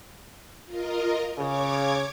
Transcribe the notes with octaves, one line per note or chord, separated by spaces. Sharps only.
F4 A#4 D#5
C#3 C#5 D6 G#6